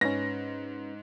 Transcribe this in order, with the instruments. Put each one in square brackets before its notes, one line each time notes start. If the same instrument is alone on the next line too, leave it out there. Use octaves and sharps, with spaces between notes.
[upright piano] G#2 [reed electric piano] C#4 B4 [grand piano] A#6